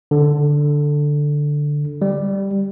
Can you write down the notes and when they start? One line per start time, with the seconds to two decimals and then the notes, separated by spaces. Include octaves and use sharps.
0.11 D3
2.02 G3